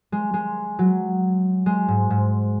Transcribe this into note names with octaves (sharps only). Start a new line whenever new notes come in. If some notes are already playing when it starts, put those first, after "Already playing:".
G#3
G#3
F#3
G#3
G#2
G#2